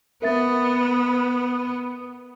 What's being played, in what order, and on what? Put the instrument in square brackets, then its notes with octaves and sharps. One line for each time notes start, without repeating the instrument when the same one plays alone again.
[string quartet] B3 [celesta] A#4 E5 A6